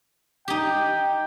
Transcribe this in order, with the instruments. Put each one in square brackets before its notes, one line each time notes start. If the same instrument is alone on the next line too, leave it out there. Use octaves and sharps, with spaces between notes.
[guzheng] D#4 G4 [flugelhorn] G5